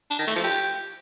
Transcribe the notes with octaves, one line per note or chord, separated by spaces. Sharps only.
D4
D#3
A3
F3
G4